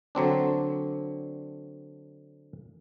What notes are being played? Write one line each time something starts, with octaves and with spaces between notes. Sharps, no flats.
D3 F#3 C4 D4